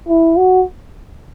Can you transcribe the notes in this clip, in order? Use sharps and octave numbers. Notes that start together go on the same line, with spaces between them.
E4
F#4